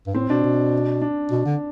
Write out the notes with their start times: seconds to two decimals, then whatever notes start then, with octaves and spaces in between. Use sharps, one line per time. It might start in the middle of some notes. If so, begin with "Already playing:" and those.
0.07 G2
0.14 A2 C4
0.29 B2 D4
0.44 B2
1.02 D4
1.31 B2
1.46 D3